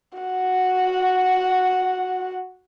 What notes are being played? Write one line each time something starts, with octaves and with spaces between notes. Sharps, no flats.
F#4 F#5